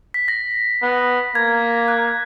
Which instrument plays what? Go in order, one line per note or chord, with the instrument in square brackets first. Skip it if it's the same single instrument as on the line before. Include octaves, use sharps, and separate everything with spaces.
[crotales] B6
A#6
[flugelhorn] B3
[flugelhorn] A#3 [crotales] G#6
[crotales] F#6